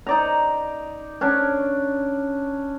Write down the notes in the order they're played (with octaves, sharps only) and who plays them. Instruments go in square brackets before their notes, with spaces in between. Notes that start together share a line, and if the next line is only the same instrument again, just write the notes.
[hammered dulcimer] D#4 D5 A#5
C#4 D4